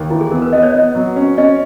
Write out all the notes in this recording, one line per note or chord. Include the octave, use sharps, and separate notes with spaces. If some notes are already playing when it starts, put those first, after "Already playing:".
Already playing: D#2
E3 E4
G#4
B3 A#4
B4
B3 D#5
C#5
B3 D#5
F#3
C#4
C#4 D#5